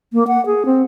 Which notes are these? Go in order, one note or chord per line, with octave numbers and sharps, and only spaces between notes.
A#3
F#5
G#4
C4